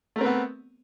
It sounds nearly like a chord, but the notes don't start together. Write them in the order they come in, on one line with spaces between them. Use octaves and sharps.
A3 A#4 C4 B4 B3